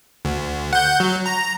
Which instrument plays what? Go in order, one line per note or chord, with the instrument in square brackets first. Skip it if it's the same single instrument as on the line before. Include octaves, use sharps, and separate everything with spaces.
[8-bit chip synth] D2
F#5 G6
F#3
A#5